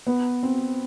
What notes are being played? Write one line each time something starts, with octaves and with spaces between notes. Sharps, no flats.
B3
C4